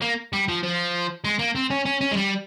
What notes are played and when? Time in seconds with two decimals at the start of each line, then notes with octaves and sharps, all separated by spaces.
0.02 A#3
0.33 G3
0.49 F3
0.63 F3
1.24 G#3
1.39 A#3
1.55 C4
1.70 C#4
1.86 C#4
2.01 C#4
2.12 G#3
2.17 G3